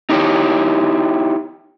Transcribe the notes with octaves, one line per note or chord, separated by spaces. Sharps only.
D#4 E4 G4 C#5